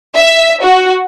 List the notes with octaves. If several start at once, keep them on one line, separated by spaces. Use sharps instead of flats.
E5
F#4